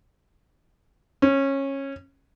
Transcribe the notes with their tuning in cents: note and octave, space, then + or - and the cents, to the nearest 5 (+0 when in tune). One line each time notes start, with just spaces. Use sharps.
C#4 -20